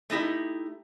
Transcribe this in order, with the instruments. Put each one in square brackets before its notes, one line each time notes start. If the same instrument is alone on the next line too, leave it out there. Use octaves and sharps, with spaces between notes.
[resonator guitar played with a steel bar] A3 D#4 E4 G4